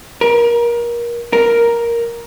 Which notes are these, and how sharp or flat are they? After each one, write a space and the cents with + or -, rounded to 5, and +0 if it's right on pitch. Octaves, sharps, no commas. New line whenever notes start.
A#4 +25
A#4 +5